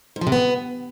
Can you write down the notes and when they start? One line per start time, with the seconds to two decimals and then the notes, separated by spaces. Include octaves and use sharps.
0.16 G#2
0.21 F3
0.27 C3
0.32 B3